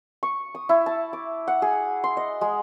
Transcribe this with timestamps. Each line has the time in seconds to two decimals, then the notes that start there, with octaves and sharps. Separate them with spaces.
0.23 C#6
0.55 D#6
0.69 E4
0.86 A5
1.13 D6
1.48 F#5
1.62 G#4
2.04 C6
2.17 D#5
2.41 G#3